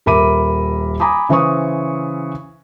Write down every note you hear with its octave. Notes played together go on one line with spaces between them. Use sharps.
D#1 A#4 E5 B5 D6 D#7
G#5 A#5 B5 D6 D#6
C#3 E3 C5 E5 C#6 D#6